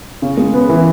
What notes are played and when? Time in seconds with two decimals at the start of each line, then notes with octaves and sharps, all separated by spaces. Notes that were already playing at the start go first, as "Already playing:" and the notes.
0.22 C#3
0.37 G#3
0.54 B3
0.69 E3